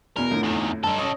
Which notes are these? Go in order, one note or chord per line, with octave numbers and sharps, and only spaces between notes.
E2 B2 A#4
F2 A2 D3
E2 D#3
G2 D#4 A4
C#4 C#5 D#5